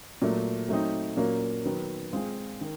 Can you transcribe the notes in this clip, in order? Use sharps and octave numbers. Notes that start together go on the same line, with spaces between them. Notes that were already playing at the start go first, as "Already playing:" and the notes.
A#2 F#3 A3
F#3 A3 C4 D#4
A#2 F#3 A#3 C#4
D#3 F#3 B3
G#3 C4 F4 G#4
D#3